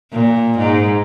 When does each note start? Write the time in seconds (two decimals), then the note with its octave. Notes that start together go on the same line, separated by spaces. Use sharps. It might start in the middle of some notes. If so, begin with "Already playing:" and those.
0.12 A#2
0.58 G#2